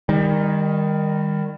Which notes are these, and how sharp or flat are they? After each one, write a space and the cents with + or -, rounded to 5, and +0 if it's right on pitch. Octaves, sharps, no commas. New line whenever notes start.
D#3 +0 G3 +30